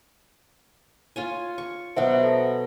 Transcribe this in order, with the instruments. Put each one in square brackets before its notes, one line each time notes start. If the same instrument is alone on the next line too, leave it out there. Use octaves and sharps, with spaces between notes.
[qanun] F4 C#5 G#5
C#6
[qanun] B2 F#3 G5 [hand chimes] C5 E5 F#5
[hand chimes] A4